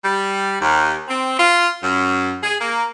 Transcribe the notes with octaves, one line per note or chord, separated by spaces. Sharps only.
G3
D#2
C4
F4
F#2
G#4
A#3